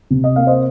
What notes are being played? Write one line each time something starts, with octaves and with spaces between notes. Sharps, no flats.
C3
D#5
A#3 F5
C5 D#5